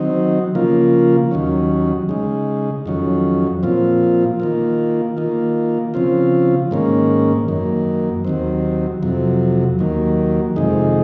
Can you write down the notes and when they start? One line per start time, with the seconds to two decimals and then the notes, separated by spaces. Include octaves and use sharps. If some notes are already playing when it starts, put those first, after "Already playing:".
Already playing: D#3 F#3 C4 D#4
0.55 C#3 F3 A#3 F4
1.31 D#2 D#3 F#3 C#4
2.09 C#3 G#3 D#4
2.86 F2 D#3 F#3 C#4
3.63 A#2 F3 C4 F4
4.40 D#3 A#3 F4
5.17 D#3 A#3 F4
5.94 C#3 F3 C4 F4
6.71 G#2 D#3 A#3 C#4
7.48 F#2 D#3 A#3
8.25 D#2 D#3 F#3 C4
9.03 F2 C3 F#3
9.79 D#2 D#3 F#3 A#3
10.56 F2 C3 D#3 G#3 D#4